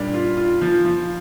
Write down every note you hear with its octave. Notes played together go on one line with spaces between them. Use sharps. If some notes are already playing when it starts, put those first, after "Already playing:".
Already playing: A#2 G3 D4
F4
F4
F3
F3